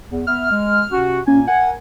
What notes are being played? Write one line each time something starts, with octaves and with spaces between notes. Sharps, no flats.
E2
B3 E5 F6
G#3
C3 C#4 F#4
A#2 A#3 C#4 G#5
A#4 F#5 G#5